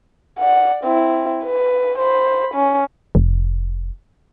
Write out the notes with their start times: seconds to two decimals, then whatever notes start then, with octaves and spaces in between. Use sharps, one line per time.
0.39 D5 F#5
0.84 C4 E4
1.44 B4
1.98 C5 B5
2.55 C#4
3.15 F1